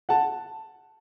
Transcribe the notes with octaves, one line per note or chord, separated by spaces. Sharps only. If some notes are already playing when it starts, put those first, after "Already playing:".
F#5 A5